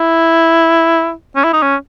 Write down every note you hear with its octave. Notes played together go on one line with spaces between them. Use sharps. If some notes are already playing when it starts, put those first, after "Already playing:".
Already playing: E4
C#4
E4
D#4
C#4